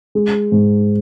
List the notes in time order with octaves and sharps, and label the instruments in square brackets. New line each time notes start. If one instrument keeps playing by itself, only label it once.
[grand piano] G#3
G#2